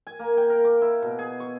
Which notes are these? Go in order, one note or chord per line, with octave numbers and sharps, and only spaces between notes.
G#5
A#3
G5
A#4
D6
E4
B2
G#4
C#6